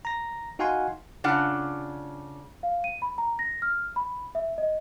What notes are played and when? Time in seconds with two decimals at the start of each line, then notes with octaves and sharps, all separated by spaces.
0.05 A#5 A#6
0.59 D#4 F#4 F5 F#5 G#5 C6
1.24 C#3 D4 F4 F#5
2.63 F5
2.84 D#7
3.02 B5
3.18 A#5
3.39 A#6
3.62 F6
3.96 B5
4.35 E5
4.58 D#5